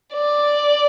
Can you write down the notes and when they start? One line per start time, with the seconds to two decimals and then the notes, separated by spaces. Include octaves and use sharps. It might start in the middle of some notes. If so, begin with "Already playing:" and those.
0.14 D5